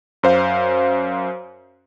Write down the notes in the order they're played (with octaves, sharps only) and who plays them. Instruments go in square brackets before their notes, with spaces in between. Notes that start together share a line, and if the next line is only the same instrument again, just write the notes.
[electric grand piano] F#2 C5 F5